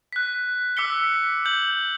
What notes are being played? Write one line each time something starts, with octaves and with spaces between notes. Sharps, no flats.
F#6 B6
D6 E6 F#6 B6 C#7 G7
G6 F#7